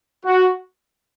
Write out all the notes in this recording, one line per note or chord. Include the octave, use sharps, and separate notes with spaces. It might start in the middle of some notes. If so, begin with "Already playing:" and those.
F#4